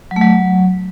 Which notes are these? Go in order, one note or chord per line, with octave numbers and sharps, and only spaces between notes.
F#3
A3
F#3